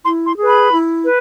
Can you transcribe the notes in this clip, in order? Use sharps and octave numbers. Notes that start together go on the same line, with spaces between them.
E4 C6
C6
G#4 B4
B5
E4
B4